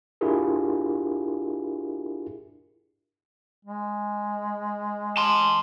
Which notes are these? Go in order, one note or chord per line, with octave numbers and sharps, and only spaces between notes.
D4 E4 F4 G4 G#4 A#4
G#3
A5 C6